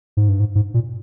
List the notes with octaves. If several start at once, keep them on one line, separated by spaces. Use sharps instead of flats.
G#2
G2
G#2
G#2
A#2